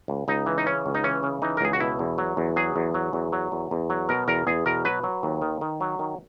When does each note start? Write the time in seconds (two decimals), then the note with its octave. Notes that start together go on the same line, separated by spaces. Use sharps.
0.08 C#2
0.28 C#2 D#4
0.46 E3
0.58 D#4
0.66 C#3 C#4
0.86 C#2
0.95 D#4
1.04 E3 C#4
1.23 C#3
1.42 E3 D#4
1.57 A#4
1.61 C#2 G#4
1.73 F#4
1.80 B2 E4
1.99 E2
2.18 F#3
2.37 E2
2.56 F#3 G#4
2.76 E2
2.94 F#3
3.13 E2
3.32 F#3
3.52 E2
3.71 E2
3.90 F#3
4.09 B2 A#4
4.28 E2 A#4
4.47 E2 G#4
4.66 B2 A#4
4.85 F#3 B4
5.03 F#3
5.23 D#2
5.42 D#3
5.61 D#3
5.81 F#3
5.99 D#3